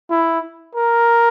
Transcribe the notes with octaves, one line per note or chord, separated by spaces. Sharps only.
E4
A#4